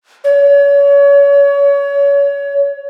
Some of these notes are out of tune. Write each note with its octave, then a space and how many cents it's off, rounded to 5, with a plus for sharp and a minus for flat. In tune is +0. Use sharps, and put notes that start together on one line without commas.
C#5 +30